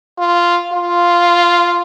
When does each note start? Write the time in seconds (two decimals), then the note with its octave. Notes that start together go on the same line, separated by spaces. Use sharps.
0.18 F4
0.73 F4